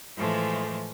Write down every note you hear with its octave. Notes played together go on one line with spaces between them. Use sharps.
A2 E3 F3 G#3 A3